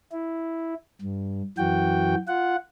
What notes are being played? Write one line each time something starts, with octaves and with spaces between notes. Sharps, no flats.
E4
G2
F#2 E3 F#4 G5
F4 F#5